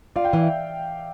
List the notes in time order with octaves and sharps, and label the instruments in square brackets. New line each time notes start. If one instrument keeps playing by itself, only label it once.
[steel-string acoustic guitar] F4 [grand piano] D5 F5
[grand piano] G5
[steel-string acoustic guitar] E3 [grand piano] D5 F5
[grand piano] E5